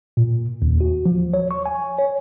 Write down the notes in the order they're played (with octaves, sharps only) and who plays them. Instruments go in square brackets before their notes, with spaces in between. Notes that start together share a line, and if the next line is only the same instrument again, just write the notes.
[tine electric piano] A#2
D#2
F#4
F3
C#5
C#6
G#5
C#5